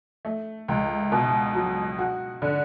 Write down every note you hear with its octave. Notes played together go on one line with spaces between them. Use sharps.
A3
C#2
B2
F#3
F#4
D3